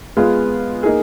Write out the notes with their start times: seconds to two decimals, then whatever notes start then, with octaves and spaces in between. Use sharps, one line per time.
0.17 G#3 B3 F4 G#4
0.83 A#3 D#4 G#4